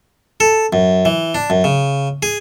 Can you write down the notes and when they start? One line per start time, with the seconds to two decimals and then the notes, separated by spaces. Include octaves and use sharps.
0.40 A4
0.73 F#2
1.05 E3
1.35 D4
1.50 F#2
1.64 C#3
2.23 G#4